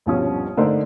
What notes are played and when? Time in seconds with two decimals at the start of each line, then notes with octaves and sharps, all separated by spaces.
0.06 D#1 G2 B2 F3 C#4 D#6
0.57 D3 A3 A#3 D4 D#4 C5